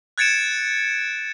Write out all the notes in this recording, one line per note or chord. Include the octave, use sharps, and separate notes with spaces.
F#6 G#6 A6 C#7 D7 E7